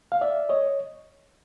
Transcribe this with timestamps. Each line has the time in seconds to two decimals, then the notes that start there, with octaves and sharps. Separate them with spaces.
0.12 F5
0.21 D5 E5
0.49 C#5 D#5